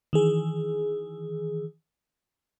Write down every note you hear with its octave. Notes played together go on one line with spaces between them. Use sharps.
D#3 E3 G#4